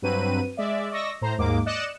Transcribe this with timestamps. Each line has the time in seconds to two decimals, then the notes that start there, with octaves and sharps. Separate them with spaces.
0.02 G2 F#3 C4 B4 D#7
0.57 G#3 D5 E5
0.90 D5 D#5 C#6 E6 A#6
1.21 A2 C5 A#5
1.38 D#2 G#2 G#3 A#3 D6
1.66 D5 D#5 F#6 C#7 E7